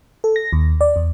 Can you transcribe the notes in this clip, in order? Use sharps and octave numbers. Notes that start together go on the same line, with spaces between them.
A4
A#6
D#2
D5
E2